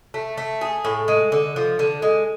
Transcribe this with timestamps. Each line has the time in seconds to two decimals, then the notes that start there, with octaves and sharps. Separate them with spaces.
0.14 A3
0.38 A3
0.61 G#4
0.85 A2
1.08 G#3
1.32 D3
1.56 F3
1.79 D3
2.02 G#3